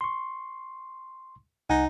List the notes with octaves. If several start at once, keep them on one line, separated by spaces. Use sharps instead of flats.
C6 C#6
C2 D#4 F#5 G#5